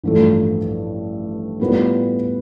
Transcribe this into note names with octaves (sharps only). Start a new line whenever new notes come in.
A1 G2 F3 A3
A2 G3 B3 F4 B4